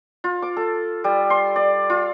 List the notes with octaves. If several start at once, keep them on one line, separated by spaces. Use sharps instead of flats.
F4
D6
A4
G3
C6
D5
F4